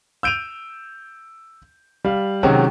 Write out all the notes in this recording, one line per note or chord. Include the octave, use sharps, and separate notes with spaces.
E6 G6 D7 D#7 F7
G3 F5
C3 D#3 F#3 G#3 C#4 F#4